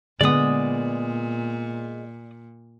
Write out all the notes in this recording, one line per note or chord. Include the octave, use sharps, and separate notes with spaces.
A#2 D3 G#3 B3 D5 D#6